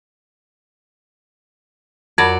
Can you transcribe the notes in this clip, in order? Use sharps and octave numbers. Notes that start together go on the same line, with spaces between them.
F2 F#3 A#4 D5 B5